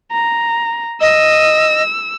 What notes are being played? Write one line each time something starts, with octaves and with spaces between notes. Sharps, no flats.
A#5
D#5 E6